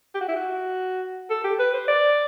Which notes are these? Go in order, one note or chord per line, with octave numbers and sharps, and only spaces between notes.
G4
F#4
E4
F#4
A4
G4
B4
C5
D5